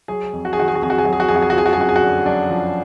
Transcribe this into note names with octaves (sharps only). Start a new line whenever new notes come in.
F#3 G#4
F2
F#4
G#4
D#3 F#4
G#4
F#4
F2 G#4
F#4
G#4
F#3 F#4
G#4
F#4
F2 G#4
F#4
G#4
F#4
F3 G#4
F#4
G#4
F#2 F#4
G#4
F#4
D3
F#2 D4
F3